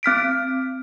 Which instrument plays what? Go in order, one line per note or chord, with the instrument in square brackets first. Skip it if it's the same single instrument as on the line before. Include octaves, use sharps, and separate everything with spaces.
[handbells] C4 F6 B6 D7